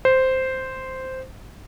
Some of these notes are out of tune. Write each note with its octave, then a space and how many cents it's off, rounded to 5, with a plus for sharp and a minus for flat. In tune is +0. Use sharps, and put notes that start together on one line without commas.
C5 -5